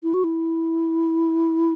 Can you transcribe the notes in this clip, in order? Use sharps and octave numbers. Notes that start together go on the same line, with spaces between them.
E4
F#4
E4